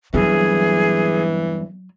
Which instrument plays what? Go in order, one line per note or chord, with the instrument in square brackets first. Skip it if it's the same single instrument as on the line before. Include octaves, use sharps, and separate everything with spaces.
[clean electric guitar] E2 G2 [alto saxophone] E3 [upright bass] F#3 [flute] G#4